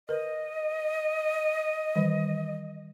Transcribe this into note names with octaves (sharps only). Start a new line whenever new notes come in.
A#4 B4 D#5
D#3 E3 G3